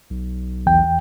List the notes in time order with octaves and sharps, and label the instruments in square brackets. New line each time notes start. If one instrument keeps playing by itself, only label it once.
[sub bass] B1
[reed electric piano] E2 G5